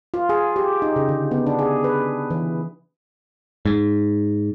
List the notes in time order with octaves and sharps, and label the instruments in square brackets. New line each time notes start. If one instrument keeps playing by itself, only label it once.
[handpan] F4
G#4
G4
D#4
C#3
D3
B3
D4
G#4
B4
E3
[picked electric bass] G#2